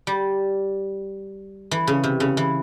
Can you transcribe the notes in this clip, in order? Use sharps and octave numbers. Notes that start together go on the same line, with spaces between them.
G3
E3
C#3
C3
C#3
E3